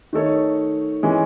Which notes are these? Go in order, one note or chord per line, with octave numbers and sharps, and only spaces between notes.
D#3 A3 D#4 A4 C#5
E3 G#3 C#4